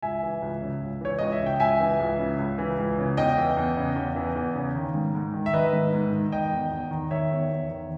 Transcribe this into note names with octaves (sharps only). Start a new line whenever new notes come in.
C#2 E5 G#5
E3
C#2
C#3
C#2
E3 C#5
C#2 D#5
E5
C#3
G5
C#2 E5 G#5
E3
C#2
C#3
C#2
E3
C#2
C#3
E2 D#5 G5
E3
E2
C#3
E2
E3
E2
C#3
D#3
G#2
G#2
D#3
E5
D#3 B4 D#5
G#2
G#2
D#3
D#3 D#5 G5
E2
E2
D#3
D#3 C#5 E5
E2
E2
D#3